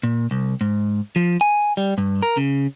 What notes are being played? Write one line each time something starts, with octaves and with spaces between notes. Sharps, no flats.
A#2
C2
G#2
F3
G#5
G3
G2
A#4
C#3